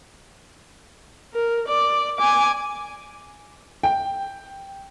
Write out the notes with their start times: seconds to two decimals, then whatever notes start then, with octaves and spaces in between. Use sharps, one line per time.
1.33 A#4
1.68 D5
2.18 G#5 D6
3.83 G5